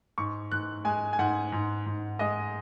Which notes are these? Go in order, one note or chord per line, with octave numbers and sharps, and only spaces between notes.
G#2 C#6
G#2 F#6
G#3 G#5
G#5
G#2 F#5
G#2
G#2
G#3 D#5